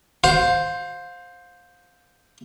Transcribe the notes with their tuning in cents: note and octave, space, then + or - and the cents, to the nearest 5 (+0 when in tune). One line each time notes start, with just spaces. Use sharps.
C5 +0 F5 +30